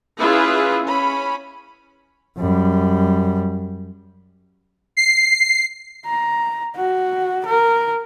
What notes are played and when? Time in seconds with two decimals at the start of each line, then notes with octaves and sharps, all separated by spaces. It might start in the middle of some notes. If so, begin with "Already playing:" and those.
0.19 C#4 E4 F4 G#4 B4 E5
0.82 C#4 B5
2.38 F#2 G3
4.97 C7
6.06 A#5
6.76 F#4
7.46 A#4